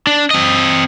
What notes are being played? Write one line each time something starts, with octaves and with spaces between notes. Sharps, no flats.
D4
C4 D#5